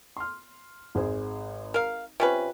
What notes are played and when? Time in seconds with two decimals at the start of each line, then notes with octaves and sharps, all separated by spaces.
0.17 C6 F6
0.95 G#1 G#4 C5
1.74 A#4 F5
2.20 C3 C#4 F4 B4